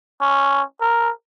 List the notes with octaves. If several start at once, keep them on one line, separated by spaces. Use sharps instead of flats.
C#4
A#4